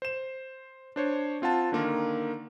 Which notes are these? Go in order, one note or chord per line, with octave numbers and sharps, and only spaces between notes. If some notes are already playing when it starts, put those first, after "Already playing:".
C5 E7
D4 C5 C#5
C4 F4 F#5 A5
D3 D#3 A#3 A#4